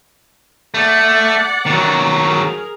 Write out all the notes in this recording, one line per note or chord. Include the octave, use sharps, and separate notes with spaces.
A3 D5 F#5
D#3 F#3
G#4 A#4